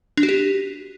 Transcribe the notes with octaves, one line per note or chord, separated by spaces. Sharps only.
D4
F#4
G4